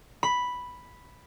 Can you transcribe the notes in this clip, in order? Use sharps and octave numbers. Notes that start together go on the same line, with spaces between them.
B5